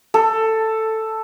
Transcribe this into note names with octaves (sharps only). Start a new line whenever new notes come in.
A4